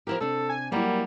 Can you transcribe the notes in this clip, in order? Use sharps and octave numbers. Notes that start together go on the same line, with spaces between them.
F3 E4 G4 A#4
C3 D4 A4
G#5
F#3 G3 A#3 E4